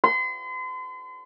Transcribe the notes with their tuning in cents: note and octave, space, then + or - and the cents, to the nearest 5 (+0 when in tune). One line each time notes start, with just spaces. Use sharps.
C6 -40